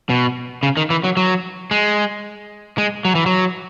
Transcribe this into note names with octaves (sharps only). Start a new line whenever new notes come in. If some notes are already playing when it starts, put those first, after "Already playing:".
B2
C#3
D#3
E3
F#3
F#3
G#3
G#3
F#3
E3
F#3